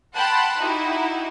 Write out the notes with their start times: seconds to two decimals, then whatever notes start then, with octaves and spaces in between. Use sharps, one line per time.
0.15 F#5 G5 A5 B5 C6 F#6
0.60 D#4 E4 F#4 G4